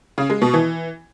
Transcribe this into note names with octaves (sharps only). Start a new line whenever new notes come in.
C#3
G#3
B2
E3